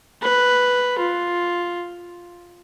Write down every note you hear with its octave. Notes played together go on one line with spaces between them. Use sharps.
B4
F4